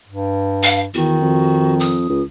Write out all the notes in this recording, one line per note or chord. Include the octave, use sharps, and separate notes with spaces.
G2
F5
E2 D#3 F#4
F2
D#6
C#2